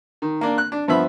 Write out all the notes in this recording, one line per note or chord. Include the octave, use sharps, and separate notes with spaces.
D#3
A#3 D4
F#6
D4
G2 F3 B3 E5 B5